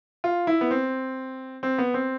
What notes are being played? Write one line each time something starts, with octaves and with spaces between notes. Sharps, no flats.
F4
E4
B3
C4
C4
B3
C4